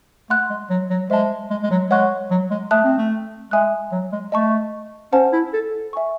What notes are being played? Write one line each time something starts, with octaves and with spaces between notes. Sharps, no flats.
A3 F#5 C6 F#6
G#3
F#3
F#3
G#3 C5 E5 A5
G#3
G#3
F#3
G#3 C#5 F#5 C#6 F#6
F#3
G#3
A3 E5 A5 D#6 F#6
C4
A3
G#3 E5 G#5 D#6 F#6
F#3
G#3
A3 D#5 A5 C#6
C#4 C5 F#5 A5
E4
A4
E5 G#5 C#6